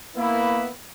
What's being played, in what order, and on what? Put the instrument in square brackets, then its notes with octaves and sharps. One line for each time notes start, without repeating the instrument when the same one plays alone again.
[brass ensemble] A#3 B3 E4